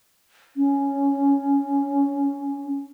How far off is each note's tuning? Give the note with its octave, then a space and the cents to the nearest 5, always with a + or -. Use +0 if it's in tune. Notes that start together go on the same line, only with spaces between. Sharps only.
C#4 +5